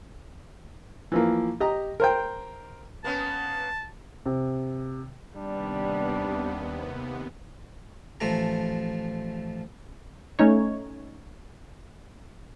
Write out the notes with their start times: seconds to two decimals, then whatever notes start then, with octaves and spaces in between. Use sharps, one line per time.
1.12 E3 F3 A#3
1.60 G4 D#5 A#5
2.00 A#4 C5 G5
3.04 A#3 B3 C#4 A5
4.26 C3
5.37 D#2 C3 G3 B3 D4
8.20 A1 F3 A3 A#5
10.39 A3 C#4 D#4 C#5